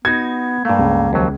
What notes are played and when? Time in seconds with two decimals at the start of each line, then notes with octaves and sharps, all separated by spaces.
0.05 B3 D#4 F#4 G#6
0.65 G2 A3 A#3
0.79 C#2
1.13 D#2 F3 F#3